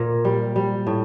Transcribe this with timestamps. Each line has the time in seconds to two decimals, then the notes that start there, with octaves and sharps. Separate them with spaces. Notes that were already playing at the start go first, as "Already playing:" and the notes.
Already playing: A#2 A#4
0.25 G3
0.56 G3
0.87 A2